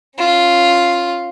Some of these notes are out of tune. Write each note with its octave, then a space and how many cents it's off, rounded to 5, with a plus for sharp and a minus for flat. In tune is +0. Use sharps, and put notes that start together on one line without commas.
C#4 -20 F4 +0